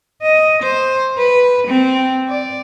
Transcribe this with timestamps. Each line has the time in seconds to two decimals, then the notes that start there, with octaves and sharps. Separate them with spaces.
0.22 D#5
0.62 C5
1.18 B4
1.67 C4
2.29 D5